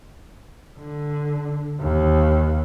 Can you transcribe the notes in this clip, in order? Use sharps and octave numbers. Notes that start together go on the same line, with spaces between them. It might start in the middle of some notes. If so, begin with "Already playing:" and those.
D3
D#2